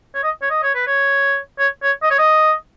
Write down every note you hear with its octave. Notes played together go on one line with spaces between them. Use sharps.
C#5
D#5
C#5
D#5
C#5
B4
C#5
C#5
C#5
D#5
C#5
D#5